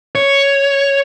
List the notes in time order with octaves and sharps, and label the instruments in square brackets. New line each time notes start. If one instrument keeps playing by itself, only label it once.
[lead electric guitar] C#5